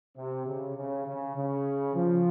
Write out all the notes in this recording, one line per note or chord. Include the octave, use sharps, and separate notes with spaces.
C3
C#3
C#3
C#3
C#3
F3